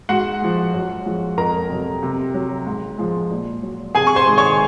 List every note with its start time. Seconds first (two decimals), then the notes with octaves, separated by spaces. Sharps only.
0.09 G#2 F#4 F#5
0.41 F3 G#3
0.73 F#2
1.06 F3 G#3
1.37 F2 A#4 A#5
1.69 C3 F#3
2.03 C3
2.34 F#3
2.66 G#2
2.98 F3 G#3
3.31 A#2
3.63 F#3
3.95 C3 G#4 G#5
4.07 C#6
4.16 C5 C6
4.27 D#3 G#3
4.38 C#5 C#6